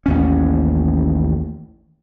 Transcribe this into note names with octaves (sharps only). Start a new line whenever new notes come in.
A1 D#2 C#4